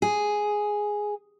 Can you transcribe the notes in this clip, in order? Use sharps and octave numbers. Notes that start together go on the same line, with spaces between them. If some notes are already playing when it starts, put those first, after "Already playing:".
G#4